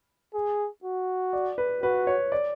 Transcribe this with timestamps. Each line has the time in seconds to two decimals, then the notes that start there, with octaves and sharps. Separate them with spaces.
0.35 G#4
0.84 F#4
1.33 D5
1.58 B4
1.83 F#4 B4
2.07 C#5
2.32 D5